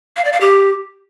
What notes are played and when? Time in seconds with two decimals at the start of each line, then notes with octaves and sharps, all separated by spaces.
0.17 F5
0.25 D5
0.33 F5
0.41 G4